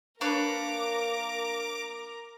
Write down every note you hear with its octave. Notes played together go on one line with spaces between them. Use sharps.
A#3 D4 A#4 B4 C#5 A#5 D6